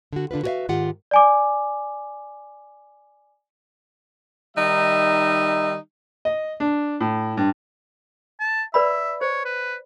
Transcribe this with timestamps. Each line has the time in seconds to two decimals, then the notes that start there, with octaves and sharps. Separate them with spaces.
0.13 D3 F#4
0.31 D3 D4 F4 B4
0.44 F#4 G#4 B4 C#5 E5 F5
0.69 G#2 D#3 F4 G4 F#5
1.11 D5 G#5 D6
4.57 D#3 G3 D#4 E5
6.25 D#5
6.60 D4
7.01 A2
7.37 G2
8.40 A5
8.74 B4 D5 E5 B5
9.21 C5 C#5
9.45 B4